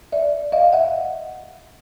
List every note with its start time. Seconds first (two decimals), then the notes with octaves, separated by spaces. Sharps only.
0.12 D5 E5
0.52 D#5 F5
0.73 E5 F#5